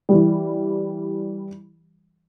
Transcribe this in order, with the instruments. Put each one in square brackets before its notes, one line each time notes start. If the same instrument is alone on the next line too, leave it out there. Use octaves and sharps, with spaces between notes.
[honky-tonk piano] E3 G3